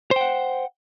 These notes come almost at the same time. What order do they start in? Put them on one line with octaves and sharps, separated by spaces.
C5 G5 F#5